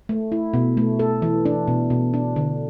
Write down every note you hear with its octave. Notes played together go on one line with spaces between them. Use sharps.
A3
E4
B2
A3
A4
E3
D4
B2
B2
D4
D3